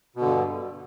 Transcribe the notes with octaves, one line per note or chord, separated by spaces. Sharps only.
G2 B2 D3